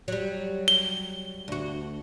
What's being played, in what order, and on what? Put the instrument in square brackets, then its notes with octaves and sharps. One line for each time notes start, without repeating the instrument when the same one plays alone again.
[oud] F#3 G3
[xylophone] G7
[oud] D2 F#4